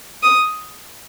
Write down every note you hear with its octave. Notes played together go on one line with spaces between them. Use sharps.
D#6